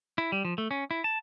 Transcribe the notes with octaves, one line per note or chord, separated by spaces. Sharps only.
E4
G3
F3
A3
C#4
E4
A5